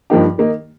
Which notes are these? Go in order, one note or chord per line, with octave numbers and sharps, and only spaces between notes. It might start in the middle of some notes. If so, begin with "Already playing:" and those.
G2 F3 A#3 D#4 G4
D#3 A#3 D#4